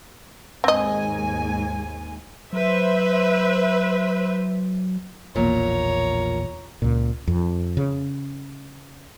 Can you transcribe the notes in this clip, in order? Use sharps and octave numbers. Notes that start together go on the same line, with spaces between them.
D#2 G#2 C4 D#5 G#5
F#3 B4 C5 E5
E1 A#1 E2 A#2 C#5 A#5
C#2 A#2
F2
C#3